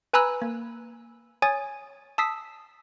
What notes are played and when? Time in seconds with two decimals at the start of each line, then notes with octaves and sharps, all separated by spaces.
0.13 B4 G#5 A#5 B5 E6 F#6
0.42 A#3
1.42 C#5 G#5 D#6 A6
2.18 A5 D#6 E6 B6 C7